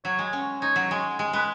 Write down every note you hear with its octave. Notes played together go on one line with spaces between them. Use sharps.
F#3 C#5
G#3
C#4
D#4 C#5
F#3
G#3
G#3
G#3 B4